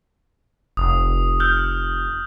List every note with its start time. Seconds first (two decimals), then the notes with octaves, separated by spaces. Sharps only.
0.77 F1 D#6
1.40 E6 F6 G6